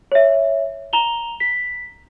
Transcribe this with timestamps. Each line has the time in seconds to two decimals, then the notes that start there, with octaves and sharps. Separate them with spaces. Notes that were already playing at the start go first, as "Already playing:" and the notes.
0.12 C#5 E5
0.93 A#5 F7 G7
1.40 B6